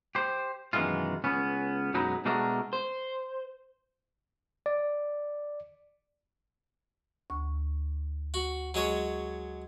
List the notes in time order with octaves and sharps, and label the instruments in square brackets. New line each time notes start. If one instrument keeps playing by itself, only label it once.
[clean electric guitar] G4 C5
F#2 B2 D#3 E3 G#3 F4
C#2 B3 C#4
B1 F#2 F#3 G#3 D#4 B4
B2 G#3 A3 D4 F#4 A#4
C5
[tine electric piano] D5
[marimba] D2 C#6
[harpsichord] F#4
F#3 G#3 C#5